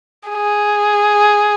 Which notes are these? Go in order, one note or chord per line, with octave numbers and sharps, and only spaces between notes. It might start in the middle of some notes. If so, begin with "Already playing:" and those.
G#4